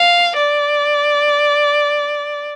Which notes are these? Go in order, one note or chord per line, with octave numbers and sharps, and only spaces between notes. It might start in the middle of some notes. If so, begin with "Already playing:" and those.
Already playing: F5
D5